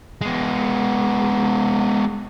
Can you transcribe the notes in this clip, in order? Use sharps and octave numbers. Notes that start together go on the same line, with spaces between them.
G#3 B3